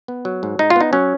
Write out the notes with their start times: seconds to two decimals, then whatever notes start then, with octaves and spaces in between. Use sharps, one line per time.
0.08 B3
0.25 F#3
0.43 G#2
0.59 G#2 D#4
0.70 F4
0.76 B3 D#4
0.93 F#3 C#4